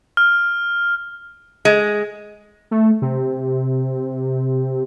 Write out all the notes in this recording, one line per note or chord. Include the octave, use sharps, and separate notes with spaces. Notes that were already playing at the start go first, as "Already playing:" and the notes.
F6
G#3
A3
C3